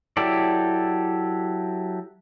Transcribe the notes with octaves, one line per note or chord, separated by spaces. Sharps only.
F#3 E4 G4 A4 D5